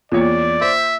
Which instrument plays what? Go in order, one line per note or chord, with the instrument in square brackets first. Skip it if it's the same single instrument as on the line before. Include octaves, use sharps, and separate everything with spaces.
[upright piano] E2 C#5 [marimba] A#3 F4 [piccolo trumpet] D5
[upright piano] C5 [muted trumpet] E5